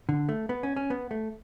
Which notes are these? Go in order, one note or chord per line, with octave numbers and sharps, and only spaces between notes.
D3
A3
B3
C#4
C#4
B3
A3